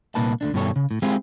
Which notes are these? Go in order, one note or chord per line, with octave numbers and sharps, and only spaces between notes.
C2 A#2 A#3 D#4 B4 A5
D2 D3 D4
G2 B2 D#3 G3 A4 C#5
C#3
A2
G#3 C4 E4 F4 G4 G#4